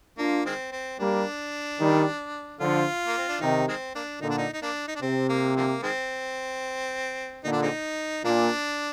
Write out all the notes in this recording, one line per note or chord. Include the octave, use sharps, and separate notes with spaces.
A#3 D4 F4
D#3 G#3 C4
C4
G3 A#3 D4
D#3 G3
D3 F3 F4
A#3
C4
D4
C3 D#3 D#4
D#3 G#3 C4
A#3 D4
A#2 D3 D#4
D4
D#4
D#4
A#3 D4
D#4
D4
C3 C4
A#3
D3 F3 A#3
D#3 G#3 C4
A#2 D3 D#4
D4
G#3 C4 D#4
A#2 A#3 D4